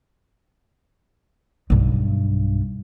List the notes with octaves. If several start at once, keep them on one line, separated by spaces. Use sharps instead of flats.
B1 G2